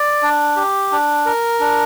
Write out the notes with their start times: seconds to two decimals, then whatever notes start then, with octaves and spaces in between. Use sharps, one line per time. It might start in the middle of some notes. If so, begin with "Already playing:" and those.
Already playing: D5
0.23 D4
0.56 G4
0.92 D4
1.26 A#4
1.60 D4